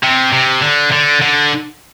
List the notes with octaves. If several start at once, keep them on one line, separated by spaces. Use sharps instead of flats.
C3
C3
D3
D3
D3